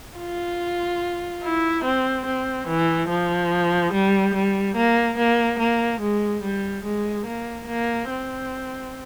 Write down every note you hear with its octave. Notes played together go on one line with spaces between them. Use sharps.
F4
E4
C4
C4
E3
F3
G3
G3
A#3
A#3
A#3
G#3
G3
G#3
A#3
A#3
C4